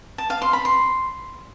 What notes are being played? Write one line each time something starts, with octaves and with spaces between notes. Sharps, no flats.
A5
F5
C6
B5
C6